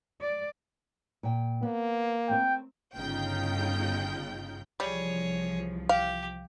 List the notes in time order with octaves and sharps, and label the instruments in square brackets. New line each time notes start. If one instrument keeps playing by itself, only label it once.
[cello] D5
[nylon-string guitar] A#2 G5
[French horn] A#3 [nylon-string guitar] B3
[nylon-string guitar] A3 C4 A#4 [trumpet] G5
[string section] G1 C#3 D#4 F4 G5 G6
[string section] C2 E3 F3 [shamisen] G3 [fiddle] G#4 C#5
[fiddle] G4 [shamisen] F5